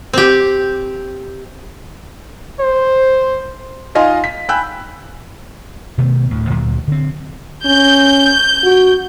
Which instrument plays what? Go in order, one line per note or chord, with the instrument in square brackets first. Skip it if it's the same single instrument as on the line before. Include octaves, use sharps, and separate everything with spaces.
[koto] C4 G4
[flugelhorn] C5
[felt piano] D#4 F4 D#5 F5 G#5 C6
B6
G5 G#5 B5 E6 F#6
[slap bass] B2 D#3 A3 B3
D1 D2 A2
D2 A#2 F#3
D3 C4
[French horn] C#4 [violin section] G6
[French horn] F#4